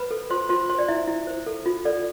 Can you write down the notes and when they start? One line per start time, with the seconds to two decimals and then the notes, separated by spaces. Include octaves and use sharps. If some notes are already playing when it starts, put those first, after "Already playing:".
Already playing: B4 C5 B5
0.11 A4
0.30 F4 C5 C6
0.49 F4 C5 C6
0.69 C5 C6
0.79 D5
0.88 E4 E5
1.07 E4
1.27 C5
1.46 A4
1.66 F4
1.85 A4 D5